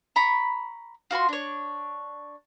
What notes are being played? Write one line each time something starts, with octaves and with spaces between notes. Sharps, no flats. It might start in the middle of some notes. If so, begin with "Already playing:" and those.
A#5 B5 C#6
F4 F#4 G#5 C6
D4 C#5